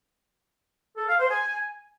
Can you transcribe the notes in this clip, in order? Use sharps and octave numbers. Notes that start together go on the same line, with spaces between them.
A4
F5
C5
G#5